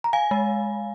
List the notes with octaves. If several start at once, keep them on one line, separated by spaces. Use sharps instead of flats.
A#5
F5 G#5
G#3